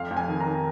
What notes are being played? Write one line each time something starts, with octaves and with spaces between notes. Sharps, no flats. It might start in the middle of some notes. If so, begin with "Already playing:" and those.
Already playing: F2 F5
F2
G#5
D#3
A#5
D#3